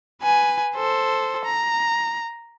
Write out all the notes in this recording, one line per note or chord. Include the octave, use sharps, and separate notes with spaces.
B4 G#5
A4 C5
A#5